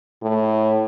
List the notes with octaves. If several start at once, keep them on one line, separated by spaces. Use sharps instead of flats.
A2